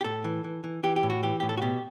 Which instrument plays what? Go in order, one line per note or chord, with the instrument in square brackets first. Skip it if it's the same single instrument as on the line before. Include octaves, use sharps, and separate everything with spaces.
[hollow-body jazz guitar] G4
A2 A4
E3
E3
E3
E3 G4
G4
A2
F#4
E3 G4
A2 G4
A4
F#4
B2 G4